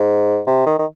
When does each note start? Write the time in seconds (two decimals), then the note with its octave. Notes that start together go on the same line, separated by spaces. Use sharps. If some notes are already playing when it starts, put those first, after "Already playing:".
Already playing: G#2
0.47 C3
0.66 D#3
0.79 D#3